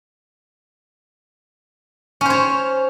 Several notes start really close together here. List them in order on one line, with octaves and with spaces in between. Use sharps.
C#4 C5 C#5